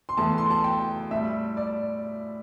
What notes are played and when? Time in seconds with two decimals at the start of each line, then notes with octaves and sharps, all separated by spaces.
0.09 C6
0.17 E2 E3 A3 A5
0.38 C6
0.50 A5
0.64 G5
1.11 A2 G3 E5
1.57 D5